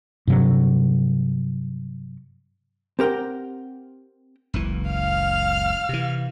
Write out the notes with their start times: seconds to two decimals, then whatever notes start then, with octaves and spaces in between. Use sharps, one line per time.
0.27 G2 C3 F#3
2.99 C4 G4 A#4 F#5 G5
4.54 F#1 C#2 E3
4.92 F5 F6
5.89 C3 E3